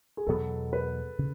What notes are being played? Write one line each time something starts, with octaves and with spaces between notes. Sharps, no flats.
G#4
E2 B2 F#3 B3 A4
B4
C#3